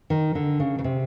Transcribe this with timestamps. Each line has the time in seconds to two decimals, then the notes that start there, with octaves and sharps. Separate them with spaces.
0.10 D#3
0.35 D3
0.60 C#3
0.79 C#3
0.84 C3